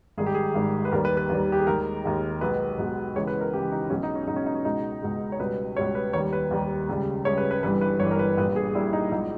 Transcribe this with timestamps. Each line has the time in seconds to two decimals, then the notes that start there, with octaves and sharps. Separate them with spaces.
0.18 G#1 G#2 D#3 G3 G#4
0.26 G4
0.34 G#4
0.54 G#1 G#2 D#3 G3
0.85 B4
0.92 D#2 D#3 G3 A#4
1.05 B4
1.17 B4
1.30 D#2 D#3 G3
1.52 G4
1.59 G#4
1.67 D#2 D#3 G#3 A#4
2.04 D#2 D#3 G#3
2.41 B1 B2 G#3 B4
2.78 B1 B2 G#3
3.15 C#2 C#3 E3 G#3 C#5
3.27 B4
3.41 A#4
3.53 C#2 C#3 E3 G#3 G4
3.72 D#4
3.90 B1 B2 G#3 C#4
4.03 D#4
4.15 C#4
4.27 B1 B2 G#3 D#4
4.36 C#4
4.46 D#4
4.55 C#4
4.65 C#2 B2 G#3 D#4
5.01 C#2 B2 G#3
5.32 C#5
5.39 C#2 B2 G3 B4
5.76 C#2 B2 G3 C#5
5.95 B4
6.13 D#2 D#3 G3 C#5
6.33 B4
6.51 D#2 D#3 G3
6.89 C#2 C#3 G3
7.25 C#2 C#3 G3 C#5
7.37 B4
7.51 B4
7.63 G1 G2 E3 G3 B4
7.81 B4
8.00 G1 G2 E3 G3 C#5
8.11 A#4
8.19 B4
8.37 A#1 A#2 G3 B4
8.56 G#4
8.75 A#1 A#2 G3 E4
8.93 D#4
9.12 B1 A#2 G#3 D#4